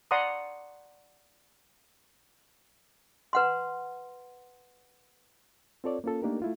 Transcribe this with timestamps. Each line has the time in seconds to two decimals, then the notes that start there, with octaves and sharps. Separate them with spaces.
0.11 D5 F#5 A#5 C6 D#6
3.33 B4 F#5 C6
5.84 C4 F4 A4 C#5 D5
6.04 A#3 C#4 F4 A4
6.22 A3 A#3 D4 D#4 G4 A#4
6.42 A3 E4 F4